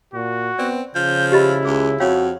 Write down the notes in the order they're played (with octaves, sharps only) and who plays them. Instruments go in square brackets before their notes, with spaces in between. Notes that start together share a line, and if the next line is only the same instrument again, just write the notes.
[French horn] A#2 [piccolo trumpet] F#4
[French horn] B3 [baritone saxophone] C4 [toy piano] D5
[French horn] C#3 [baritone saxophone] F3 [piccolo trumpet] G6
[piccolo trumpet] E4 [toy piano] G4 D#5 B5
[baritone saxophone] C#2 [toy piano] G#4 E6
[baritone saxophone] F2 [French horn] F#4 [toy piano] C#5 F5 G5